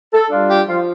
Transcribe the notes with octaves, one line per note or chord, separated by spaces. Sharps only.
A4
G3 D4 F4
G4
F3 F4